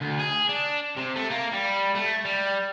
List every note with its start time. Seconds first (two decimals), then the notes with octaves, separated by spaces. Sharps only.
0.01 D2
0.19 G#4
0.49 D4
0.97 C3
1.16 A3
1.30 A#3
1.52 G3
1.95 A3
2.25 G3